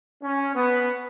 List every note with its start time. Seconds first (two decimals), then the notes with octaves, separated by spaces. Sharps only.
0.23 C#4
0.55 B3